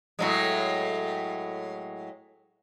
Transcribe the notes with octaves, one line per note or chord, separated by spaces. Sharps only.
A2 F#3 G#3